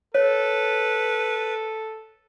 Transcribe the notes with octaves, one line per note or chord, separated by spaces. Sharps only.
A4 B4 C#5